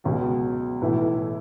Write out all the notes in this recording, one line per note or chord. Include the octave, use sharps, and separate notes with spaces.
C#2 B2 F#3
B1 A2 E3 B3 E4